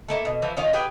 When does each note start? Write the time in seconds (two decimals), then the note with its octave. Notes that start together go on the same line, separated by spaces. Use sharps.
0.08 A3 A#3 E4
0.25 B2
0.42 E3 F3 E4
0.57 D#3 C#4 F4 D5
0.73 G4 G#4 B4 G5